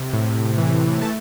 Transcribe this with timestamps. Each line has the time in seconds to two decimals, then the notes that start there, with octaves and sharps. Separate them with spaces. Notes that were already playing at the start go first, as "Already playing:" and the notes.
Already playing: C3
0.13 A2
0.58 E3
1.02 A3 A5